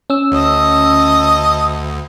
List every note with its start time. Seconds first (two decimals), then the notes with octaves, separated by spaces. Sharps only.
0.10 C#4 E6
0.32 D2 A4 D#5 D#6